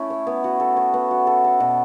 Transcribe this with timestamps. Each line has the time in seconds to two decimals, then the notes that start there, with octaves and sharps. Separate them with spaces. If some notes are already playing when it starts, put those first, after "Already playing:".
Already playing: A3 C#4 E4
0.10 C#5
0.27 B3
0.44 F#4
0.60 A4
0.77 C#5
0.94 B3
1.11 F#4
1.27 A4
1.44 A4
1.60 B2